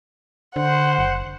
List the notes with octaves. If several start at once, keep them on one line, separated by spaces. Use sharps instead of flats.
D3 C5 F#5
F#1